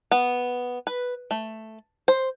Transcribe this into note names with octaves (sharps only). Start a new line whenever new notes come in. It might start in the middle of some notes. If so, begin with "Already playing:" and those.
B3
B4
A3
C5